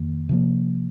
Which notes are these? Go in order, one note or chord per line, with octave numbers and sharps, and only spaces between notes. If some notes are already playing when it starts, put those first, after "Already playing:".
Already playing: F2 D#3 A#3
C3 F3 A#3